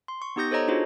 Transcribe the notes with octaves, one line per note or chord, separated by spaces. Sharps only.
C6
C#6
B3 D#4 G4 D#6 G6 A#6
A4 C5 C#5 D#5 A#5
D4 D#4 F4 F#4 G#4 C5